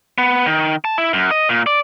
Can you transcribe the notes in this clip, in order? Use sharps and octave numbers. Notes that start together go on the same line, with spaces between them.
B3
D#3
A5
E4
F#2
D#5
A#2
D5